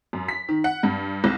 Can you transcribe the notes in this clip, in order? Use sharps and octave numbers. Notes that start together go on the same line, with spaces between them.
F#2
B6
D#3
F#5
G2
C2